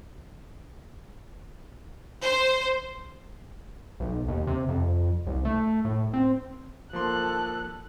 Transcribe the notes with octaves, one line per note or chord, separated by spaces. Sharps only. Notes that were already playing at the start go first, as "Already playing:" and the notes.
C5
B1
D#2
C3
F2
C2
A3
A2
C4
F3 A#3 A4 C6 F#6